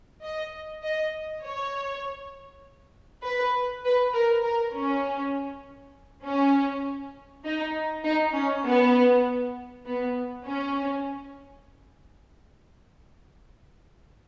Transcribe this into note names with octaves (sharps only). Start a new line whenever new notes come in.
D#5
D#5
C#5
B4
B4
A#4
A#4
C#4
C#4
D#4
D#4
C#4
B3
B3
C#4